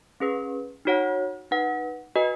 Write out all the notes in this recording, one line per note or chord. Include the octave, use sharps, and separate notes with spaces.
C#4 G#4 B4
D#4 F#4 C#5 F#5
D#4 B4 F#5
F#4 B4 D#5 G#5